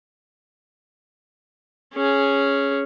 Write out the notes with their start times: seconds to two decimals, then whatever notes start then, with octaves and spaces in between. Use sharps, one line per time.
1.94 C#4 G#4